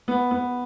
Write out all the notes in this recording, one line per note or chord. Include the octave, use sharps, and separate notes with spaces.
B3
B3